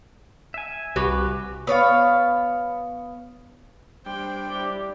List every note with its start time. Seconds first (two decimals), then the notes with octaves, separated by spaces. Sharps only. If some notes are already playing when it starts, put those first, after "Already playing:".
0.54 E5 G#5
0.96 C2 F#4 G4 B4
1.67 B3 C#5 D5 F5
4.06 G3 D4 C5 G5
4.49 E4 G4 D5